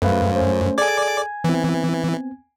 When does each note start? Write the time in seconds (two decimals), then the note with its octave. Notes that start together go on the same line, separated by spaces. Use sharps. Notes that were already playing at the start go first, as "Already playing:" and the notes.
0.02 F#2 A3 B4 C5 F5
0.36 A3 C#4 C5
0.78 G#4 A4 D5 G#5 D6 G#6
1.44 E3 B3 C4